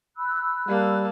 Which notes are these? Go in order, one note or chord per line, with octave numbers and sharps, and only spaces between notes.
B5 E6 F#6
G3 A#3 A5